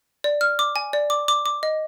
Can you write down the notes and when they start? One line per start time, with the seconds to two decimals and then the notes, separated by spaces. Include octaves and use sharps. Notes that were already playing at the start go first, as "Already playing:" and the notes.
0.24 D5
0.41 F6
0.59 D6
0.76 G#5
0.93 D5
1.10 D6
1.28 D6
1.46 D6
1.63 D#5